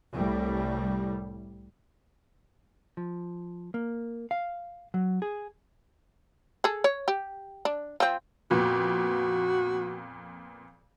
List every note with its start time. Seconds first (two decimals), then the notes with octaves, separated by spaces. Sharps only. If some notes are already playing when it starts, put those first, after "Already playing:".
0.11 C2 A2 G3
2.97 F3
3.74 A#3
4.31 F5
4.94 F#3
5.22 G#4
6.64 G#4 A4
6.84 C#5
7.08 G4
7.65 D4
8.00 F3 C4
8.51 F2 A#2 B3 F#4